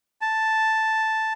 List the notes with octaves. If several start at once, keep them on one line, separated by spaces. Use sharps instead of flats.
A5